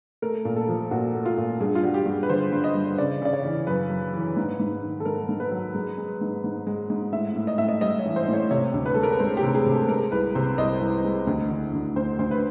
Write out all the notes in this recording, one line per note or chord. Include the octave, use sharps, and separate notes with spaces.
A3 A#4
A#2
A4
F3
A#2 F#4
A3
F4
A#2
G2 G#4
F4
G3 F#4
G4
G2
B4
D3 C5
G2
D#5
G2
C#3 D5
C#3 D5
C#5
E3
F#2 B4
F#2
E3
G#2
G#2
D#3
A4
G#2 A#4
G#2
B4
F#3
G#3
G#3
G#2
G#2
G#3
G#2
A2 E5
A2
D#5
A2 E5
D#5
G3 D#5
C#5
E3
C5
A2
C#5
C3 C#5
D2
B4
G#3 A4
A#4
B4
G#3 C5
G4
C3
G#4
C3
A4
G#3 A#4
C2 B4
C3 C5
C2 D#5
C2
G#3
D2
D3
D2
D2 C5
D2 C5
B4